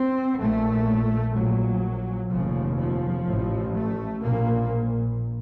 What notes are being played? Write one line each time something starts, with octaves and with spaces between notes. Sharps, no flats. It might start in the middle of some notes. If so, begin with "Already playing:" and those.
Already playing: C4
A#1 A#2 A3
A#1 A#2 F#3
F1 D#2 C#3 F3
F3
A1 A2
A3
A#1 A#2 A#3